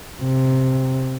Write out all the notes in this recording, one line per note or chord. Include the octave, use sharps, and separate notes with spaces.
C3